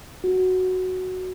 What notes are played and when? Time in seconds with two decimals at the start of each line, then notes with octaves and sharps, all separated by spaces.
0.24 F#4